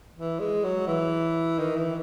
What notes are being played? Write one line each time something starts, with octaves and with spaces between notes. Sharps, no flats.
E3
G#3
F#3
E3
D#3
E3